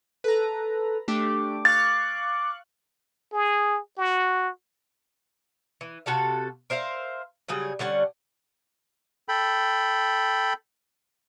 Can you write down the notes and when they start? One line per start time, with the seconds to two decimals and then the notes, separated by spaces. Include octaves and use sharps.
0.24 A4 B4 A#5
1.08 A3 D4 G4 D6
1.65 F5 C#6 F#6 A6
3.32 G#4
3.98 F#4
5.81 E3
6.06 C3 F#4 A4 F5
6.70 A#4 C5 E5 F5
7.48 C#3 F#3 G3 G#4
7.79 D3 G3 C#4 F#5
9.29 A4 G5 B5